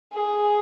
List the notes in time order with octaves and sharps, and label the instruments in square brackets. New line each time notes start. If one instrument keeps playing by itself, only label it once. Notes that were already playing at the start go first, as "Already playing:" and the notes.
[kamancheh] G#4